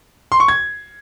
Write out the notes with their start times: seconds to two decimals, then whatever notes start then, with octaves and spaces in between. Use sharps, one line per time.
0.32 C6
0.40 C#6
0.48 G#6